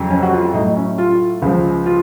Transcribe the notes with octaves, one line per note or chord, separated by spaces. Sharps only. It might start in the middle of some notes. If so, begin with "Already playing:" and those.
Already playing: F2 C#3 F#3
C#4
F#4
F4
A2 D#4
F#3
C#4
F4
C#2 C#3 F3
F4